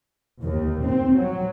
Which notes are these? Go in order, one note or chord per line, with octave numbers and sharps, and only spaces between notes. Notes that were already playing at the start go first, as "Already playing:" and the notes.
D#2
C4
F#3